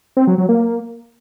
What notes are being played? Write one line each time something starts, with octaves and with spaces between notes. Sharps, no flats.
C4
F#3
F#3
A#3